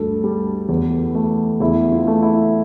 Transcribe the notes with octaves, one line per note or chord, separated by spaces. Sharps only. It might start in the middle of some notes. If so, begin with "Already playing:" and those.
Already playing: D2 G2 A4
G3
E2
A3
E2 E4
F4
A3
E4